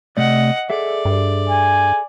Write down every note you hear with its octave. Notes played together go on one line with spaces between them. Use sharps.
C3 A3 D5 D#5 F#5
G#4 A4 D5 E5
G2
G#5